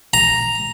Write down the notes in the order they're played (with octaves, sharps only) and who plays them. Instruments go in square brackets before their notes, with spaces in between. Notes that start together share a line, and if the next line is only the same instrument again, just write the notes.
[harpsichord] A#5